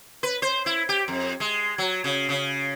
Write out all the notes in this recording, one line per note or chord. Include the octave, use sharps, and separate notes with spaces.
B4
C5
E4
G4
F2
G#3
F#3
C#3
C#3